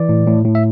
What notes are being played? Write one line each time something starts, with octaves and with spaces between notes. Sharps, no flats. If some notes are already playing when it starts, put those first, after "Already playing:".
Already playing: E3 D5
A2
A2
A2
E5